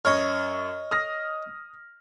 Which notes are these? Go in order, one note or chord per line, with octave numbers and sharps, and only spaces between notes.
F#2 C#5 D#5 C#6 F6
D#6 F6 A#6